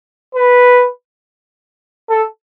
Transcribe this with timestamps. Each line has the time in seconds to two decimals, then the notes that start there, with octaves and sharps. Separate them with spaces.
0.35 B4
2.10 A4